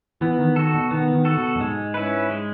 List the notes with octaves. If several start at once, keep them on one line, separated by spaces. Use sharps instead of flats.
E3 B3
D#3
D#3 F#4 A4
B2
D#3 B3
D#3
F#4 A4
B2
F#2
G#2 G#3
C#4 E4 B4
G#3